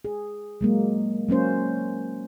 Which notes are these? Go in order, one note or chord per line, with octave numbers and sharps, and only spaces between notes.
G#4
F#3 G#3 A#3
F#3 A#3 C#4 C5